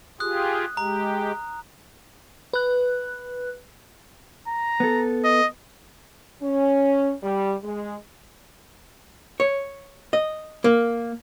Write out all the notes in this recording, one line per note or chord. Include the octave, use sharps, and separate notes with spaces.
F4 G4 G#4 D#6 F#6
G#3 G4 A#5
B4 F#6
A#5
B3 A4
D#5
C#4
G3
G#3
C#5
D#5
A#3